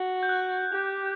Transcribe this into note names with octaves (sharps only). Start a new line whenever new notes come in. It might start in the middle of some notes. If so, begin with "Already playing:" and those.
Already playing: F#4
G6
F#6
G4